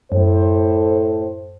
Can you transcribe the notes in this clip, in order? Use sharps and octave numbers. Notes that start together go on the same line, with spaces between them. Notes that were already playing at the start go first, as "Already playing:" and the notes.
F#2 A2 A4 C5